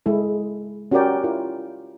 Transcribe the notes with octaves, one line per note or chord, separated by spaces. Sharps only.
G#3 E4 A4
C#4 F#4 G4 A#4 D5 G5
E4 F4 A#4